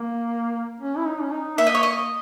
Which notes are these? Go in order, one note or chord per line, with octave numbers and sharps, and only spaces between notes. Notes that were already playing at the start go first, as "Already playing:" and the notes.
Already playing: A#3
C#4
E4
D#4
C#4
D#4
A#3 E5
D#5
C#5
A#3 D#5